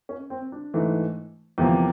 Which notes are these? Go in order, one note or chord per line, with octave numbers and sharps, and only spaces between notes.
C#4
C4
D4
G#2 E3 A3
E2 C3 F3 A#3